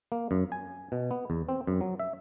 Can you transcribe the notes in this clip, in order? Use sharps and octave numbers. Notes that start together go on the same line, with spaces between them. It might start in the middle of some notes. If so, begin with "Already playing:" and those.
A#3
F#2
G#5
B2
B3
E2
C4
F#2
F#3
E5